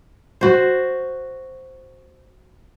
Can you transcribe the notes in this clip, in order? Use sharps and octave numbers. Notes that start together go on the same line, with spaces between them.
F#4 C5